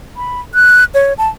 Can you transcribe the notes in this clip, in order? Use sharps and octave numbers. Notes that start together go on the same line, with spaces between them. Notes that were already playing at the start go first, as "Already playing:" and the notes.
B5
F#6
C#5
A5